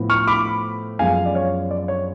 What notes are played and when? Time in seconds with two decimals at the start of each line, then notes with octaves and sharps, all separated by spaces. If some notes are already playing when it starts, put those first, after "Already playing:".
Already playing: A2 F3 B3
0.10 C#6 F6
0.27 B5 D6
0.99 F#2 F3 G#3 B3 F5 G#5
1.26 D5
1.35 C#5 F5
1.71 D5
1.88 C#5